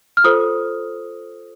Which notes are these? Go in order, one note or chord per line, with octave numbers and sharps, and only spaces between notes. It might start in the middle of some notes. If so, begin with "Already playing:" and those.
F6
F4 A4 C5 D#6